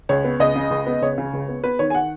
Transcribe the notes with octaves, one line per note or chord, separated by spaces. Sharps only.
C#2 C#5
B3
C#2 D#5
C#3
C#2
B3
C#2 C#5
C#3
C#2
B3
B3 B4
D#3 C#5
G#5
F#5